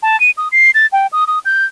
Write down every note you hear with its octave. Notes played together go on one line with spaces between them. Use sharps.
A5
D#7
D#6
C7
A6
G5
D#6
D#6
G6